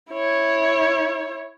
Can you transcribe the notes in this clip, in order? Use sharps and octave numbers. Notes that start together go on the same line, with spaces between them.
E4 C#5